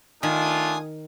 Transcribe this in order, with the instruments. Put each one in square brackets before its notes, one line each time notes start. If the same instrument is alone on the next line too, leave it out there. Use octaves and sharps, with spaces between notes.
[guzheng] D#3 [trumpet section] A3 D4 F4 [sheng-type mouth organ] G#5 D#6